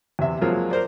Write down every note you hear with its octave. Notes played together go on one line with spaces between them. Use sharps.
E2 C3 E5
F3 F#3 G#3 A#3 C4 F4
A#4 C5 D5